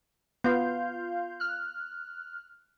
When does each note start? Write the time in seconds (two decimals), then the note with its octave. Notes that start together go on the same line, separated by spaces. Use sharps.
0.44 B3 F4 F5 G6
1.40 F6 F#6